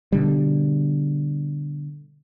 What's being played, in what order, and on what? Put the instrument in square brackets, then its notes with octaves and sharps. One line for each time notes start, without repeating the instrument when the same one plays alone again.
[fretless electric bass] B2 D3 G3